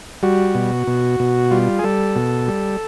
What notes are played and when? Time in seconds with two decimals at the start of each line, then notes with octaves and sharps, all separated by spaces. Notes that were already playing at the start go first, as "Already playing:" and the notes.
0.23 G3 F#4
0.55 B2
0.87 B2
1.20 B2
1.51 G3 F4
1.79 G#4
1.84 G3 A4
2.16 B2
2.48 G3